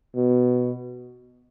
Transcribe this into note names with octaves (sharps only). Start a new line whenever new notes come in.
B2